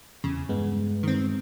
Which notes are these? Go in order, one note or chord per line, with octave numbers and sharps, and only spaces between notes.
E2 C#3
G2 G#3 B3
D#3 C4